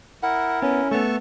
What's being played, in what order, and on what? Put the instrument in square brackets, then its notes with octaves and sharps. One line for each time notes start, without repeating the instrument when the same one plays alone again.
[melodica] E4 A#4 [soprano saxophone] F#5
[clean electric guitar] B3 [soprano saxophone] C#4
[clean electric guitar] A3 B3 [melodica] A4 A5 C#6